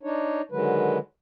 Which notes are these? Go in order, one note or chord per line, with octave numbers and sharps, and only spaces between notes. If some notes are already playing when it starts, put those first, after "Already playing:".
D4 D#4 C#5
D3 D#3 F#3 G#3 B4